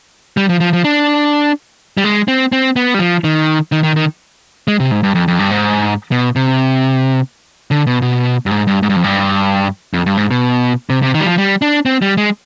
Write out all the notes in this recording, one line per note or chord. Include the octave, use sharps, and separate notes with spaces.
G3
F3
F3
F3
D4
G3
G#3
C4
C4
B3
G3
F3
D#3
D#3
D#3
D#3
G#3
C3
G#2
G2
F2
F2
G2
G#2
B2
C3
D3
B2
B2
G2
G#2
G2
G#2
G2
F2
G2
F2
G2
G#2
B2
C3
C3
D#3
G3
F3
G3
D4
C4
G3
G#3